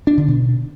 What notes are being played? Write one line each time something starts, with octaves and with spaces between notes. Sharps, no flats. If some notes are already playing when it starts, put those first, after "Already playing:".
D4
D3
B2